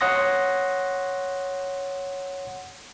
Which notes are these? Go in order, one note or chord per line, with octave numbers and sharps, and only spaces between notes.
C#5 F#5 C6 D#6 A#6